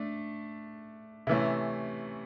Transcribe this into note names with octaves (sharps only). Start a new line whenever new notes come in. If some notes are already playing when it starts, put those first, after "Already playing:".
Already playing: A3 D4
C3 E3 A3 C#4